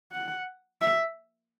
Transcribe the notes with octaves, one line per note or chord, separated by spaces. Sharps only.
F#5
E5